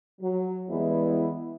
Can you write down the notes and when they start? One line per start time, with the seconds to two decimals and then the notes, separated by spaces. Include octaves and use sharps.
0.21 F#3
0.68 E2 E3 G3 G#3 B3 E4